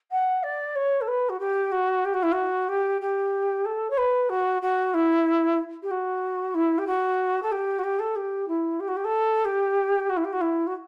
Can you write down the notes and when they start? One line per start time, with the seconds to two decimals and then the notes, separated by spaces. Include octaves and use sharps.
0.11 F#5
0.43 D5
0.75 C#5
1.01 A4
1.07 B4
1.29 F#4
1.39 G4
1.71 F#4
2.04 G4
2.13 F#4
2.22 E4
2.32 F#4
2.68 G4
3.01 G4
3.65 A4
3.90 C#5
3.97 B4
4.29 F#4
4.62 F#4
4.94 E4
5.82 G4
5.90 F#4
6.54 E4
6.78 G4
6.86 F#4
7.42 A4
7.51 G4
7.78 F#4
7.83 G4
7.99 A4
8.15 G4
8.48 E4
8.80 G4
8.87 F#4
8.96 G4
9.04 A4
9.44 G4
10.09 F#4
10.16 E4
10.24 G4
10.32 F#4
10.41 E4
10.66 F#4